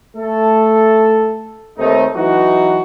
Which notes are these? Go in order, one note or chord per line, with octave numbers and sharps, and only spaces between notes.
A3 A4
D#2 A3 C4 D#4
E3 F#3 D#4 E4 F#4